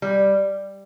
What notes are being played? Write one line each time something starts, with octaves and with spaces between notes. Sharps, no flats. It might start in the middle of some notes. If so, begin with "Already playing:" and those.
G3